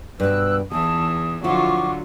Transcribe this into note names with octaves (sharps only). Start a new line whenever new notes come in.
G2 B2 B4 E6 F#6
E2 E3 D#4 G#4 A5 D#6
D3 F3 F#3 E4 F4 F#5 C#6 D6